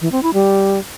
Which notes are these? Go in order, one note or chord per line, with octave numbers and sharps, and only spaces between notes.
E3
C4
E4
G3